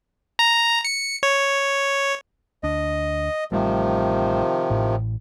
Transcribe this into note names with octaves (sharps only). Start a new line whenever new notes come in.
A#5
C#7
C#5
D2 D4 D#5
A1 C3 D#3 F3 G3 A3
A1 A2